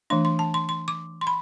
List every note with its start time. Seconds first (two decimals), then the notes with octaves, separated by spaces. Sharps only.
0.10 E3 A3 D4 C6
0.25 C6
0.39 A5
0.54 C6
0.69 C6
0.88 D6
1.21 C6
1.27 B5